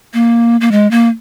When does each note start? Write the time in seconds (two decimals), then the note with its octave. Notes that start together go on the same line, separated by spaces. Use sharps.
0.14 A#3
0.61 A#3
0.72 G#3
0.91 A#3